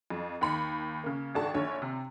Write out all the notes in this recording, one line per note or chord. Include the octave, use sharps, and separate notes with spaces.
F2
D#2 B5 C#7
C#3 A#3
G#1 D4 F#4 A4 A5
A#1 D3 C#5
C3